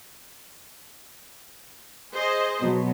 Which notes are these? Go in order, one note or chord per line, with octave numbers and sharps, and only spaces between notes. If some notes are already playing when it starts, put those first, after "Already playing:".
G#4 C5 D#5
B2 F#3 B3